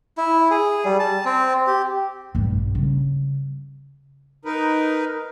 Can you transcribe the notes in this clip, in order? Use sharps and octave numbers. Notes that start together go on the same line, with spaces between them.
E4
G#4
G3
A5
C4
G4
A#1 G2
C#3 G3
D#4 A#4 B4